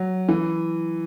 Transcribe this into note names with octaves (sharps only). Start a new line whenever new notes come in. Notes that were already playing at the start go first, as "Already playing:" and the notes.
Already playing: F#3
E3